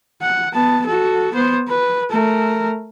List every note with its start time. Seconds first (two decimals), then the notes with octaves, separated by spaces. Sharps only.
0.22 F#5
0.53 B3 A5
0.86 F#4 A4
1.34 B3 C5
1.68 B4
2.10 A3 A#4